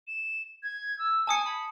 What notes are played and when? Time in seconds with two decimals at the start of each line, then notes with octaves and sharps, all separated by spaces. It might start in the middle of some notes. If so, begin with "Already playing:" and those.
0.07 E7
0.63 G#6
0.99 E6
1.27 G#5 A5 D#6 C#7
1.45 B5